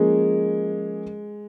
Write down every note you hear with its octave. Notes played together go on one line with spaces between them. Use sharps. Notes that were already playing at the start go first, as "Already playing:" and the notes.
Already playing: F3 G#3 A#3 C#4 G#4